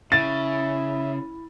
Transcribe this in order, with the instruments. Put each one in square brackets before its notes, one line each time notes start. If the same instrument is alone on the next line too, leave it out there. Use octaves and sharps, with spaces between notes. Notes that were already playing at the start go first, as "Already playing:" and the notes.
[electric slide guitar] C#3 [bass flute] E4 [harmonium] E5 [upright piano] A6